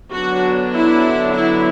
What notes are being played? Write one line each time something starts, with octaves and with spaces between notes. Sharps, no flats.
D3 F#3 B3 D4 F#4
E4
E4